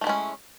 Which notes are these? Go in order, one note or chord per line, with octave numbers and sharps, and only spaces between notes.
G#3 A3 C#4 E4